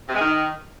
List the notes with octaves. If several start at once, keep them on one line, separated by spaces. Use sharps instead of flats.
C3
G#3
D#3